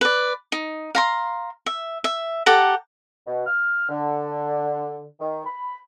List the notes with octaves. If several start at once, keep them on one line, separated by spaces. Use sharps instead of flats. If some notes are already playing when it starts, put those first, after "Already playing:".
B4 D5
D#4
F5 A#5 C6
E5
E5
G4 A4 F#5 A#5
B2
F6
D3
D#3
B5